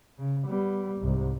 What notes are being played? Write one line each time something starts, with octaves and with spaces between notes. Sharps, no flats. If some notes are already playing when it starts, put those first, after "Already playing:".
C#3
G3 B3
C2 G#2